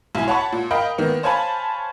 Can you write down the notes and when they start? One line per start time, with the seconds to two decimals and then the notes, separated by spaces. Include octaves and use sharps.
0.15 B1 E4 G#5
0.28 C#5 F#5 A5 B5 C#6
0.52 A#2
0.71 A#4 D#5 F5 G5 B5
0.98 D#3 A#3 B3
1.23 C5 C#5 F5 G#5 A5 B5